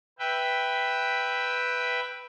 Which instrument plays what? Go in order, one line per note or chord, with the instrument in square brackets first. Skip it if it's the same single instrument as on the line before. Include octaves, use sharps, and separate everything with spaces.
[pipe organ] B4 E5 G5